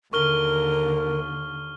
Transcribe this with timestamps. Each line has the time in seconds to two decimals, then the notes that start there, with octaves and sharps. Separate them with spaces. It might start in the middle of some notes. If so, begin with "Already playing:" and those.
0.13 D#2 D3 A#4 C#6 F6 G7